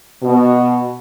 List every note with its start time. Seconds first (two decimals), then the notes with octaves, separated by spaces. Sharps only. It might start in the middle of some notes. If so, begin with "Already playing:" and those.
0.23 B2